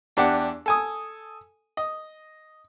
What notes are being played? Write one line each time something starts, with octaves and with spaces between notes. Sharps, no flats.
E2 D4 G4 F#5
A4 G#5 D#6
D#5